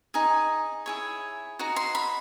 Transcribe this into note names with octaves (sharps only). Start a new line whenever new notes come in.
D#4 G#4
E4 G#4 C#5
D#4 F#4
C6
B5